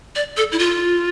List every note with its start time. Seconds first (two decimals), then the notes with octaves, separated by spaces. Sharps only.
0.16 D5
0.37 A4
0.52 E4
0.59 F4